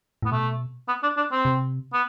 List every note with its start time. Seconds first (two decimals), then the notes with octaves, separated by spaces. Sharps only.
0.22 A2 B3
0.31 B2 A3
0.88 B3
1.03 D4
1.17 D4
1.32 C4
1.45 C3
1.93 B3